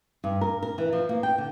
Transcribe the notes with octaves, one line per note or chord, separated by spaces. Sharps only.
G2
A#4
A#4
E3
F3
A#3
G5
D3